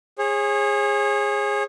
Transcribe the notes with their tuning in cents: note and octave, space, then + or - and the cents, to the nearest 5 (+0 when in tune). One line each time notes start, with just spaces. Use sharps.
G#4 -15 C#5 -35